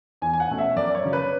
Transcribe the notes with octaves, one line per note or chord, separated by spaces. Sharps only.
E2 G#5
G#5
F#5
B2 A3 C#4
E5
F#2 D5
C#5
C#3 F#3 C#4
B4